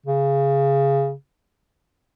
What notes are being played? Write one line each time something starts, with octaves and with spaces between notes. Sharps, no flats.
C#3